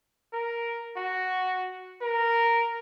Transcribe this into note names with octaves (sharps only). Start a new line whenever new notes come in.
A#4
F#4
A#4